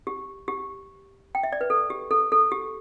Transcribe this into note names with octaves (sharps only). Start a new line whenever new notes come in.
G4
G4
G5
E5
D5
B4
A4
G4
A4
A4
G4